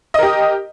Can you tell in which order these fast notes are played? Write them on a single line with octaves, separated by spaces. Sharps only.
D#5 A#4 G4